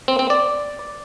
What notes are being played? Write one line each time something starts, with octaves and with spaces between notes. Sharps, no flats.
C4
C4
D5